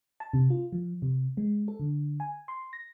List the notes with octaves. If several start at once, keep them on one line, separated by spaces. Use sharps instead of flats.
A5
C3
F4
F3
C3
G#3
A4
D3
G#5
C6
A#6